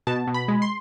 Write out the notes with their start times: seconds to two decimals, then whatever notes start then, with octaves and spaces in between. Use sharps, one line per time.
0.07 B2 A5
0.27 B2
0.34 B5
0.48 G#3
0.62 C6